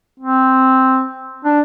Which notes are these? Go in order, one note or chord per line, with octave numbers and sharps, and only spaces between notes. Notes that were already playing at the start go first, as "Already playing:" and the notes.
C4
D4